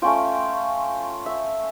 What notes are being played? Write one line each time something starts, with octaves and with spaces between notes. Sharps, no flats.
A3 C#4 F4 G5
E5